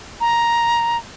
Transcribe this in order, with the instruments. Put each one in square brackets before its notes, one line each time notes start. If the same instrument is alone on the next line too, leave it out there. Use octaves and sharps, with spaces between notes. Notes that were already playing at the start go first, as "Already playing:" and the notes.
[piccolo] A#5